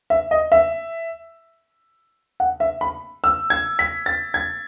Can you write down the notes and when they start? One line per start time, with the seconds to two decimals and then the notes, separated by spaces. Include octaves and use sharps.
0.10 E5
0.31 D#5
0.52 E5
2.40 F#5
2.60 E5
2.81 B5
3.24 E6
3.50 G#6
3.79 B6
4.06 A6
4.34 G#6